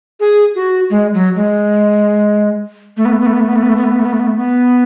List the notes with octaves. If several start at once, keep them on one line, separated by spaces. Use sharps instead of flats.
G#4
F#4
G#3
F#3
G#3
A3
B3
A3
B3
A3
B3
A3
B3
A3
B3
A3
B3
A3
B3
A3
B3
A3
B3
A3
B3